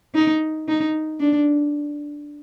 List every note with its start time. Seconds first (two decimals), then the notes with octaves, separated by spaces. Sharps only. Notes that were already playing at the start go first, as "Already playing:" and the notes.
0.15 D#4
0.68 D#4
1.20 D4